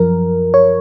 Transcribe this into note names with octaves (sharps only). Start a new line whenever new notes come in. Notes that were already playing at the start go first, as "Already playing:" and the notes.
Already playing: F#2 F3 A#4
C#5